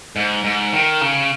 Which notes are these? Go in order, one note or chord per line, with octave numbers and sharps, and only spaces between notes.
G#2
G#2
D#3
C#3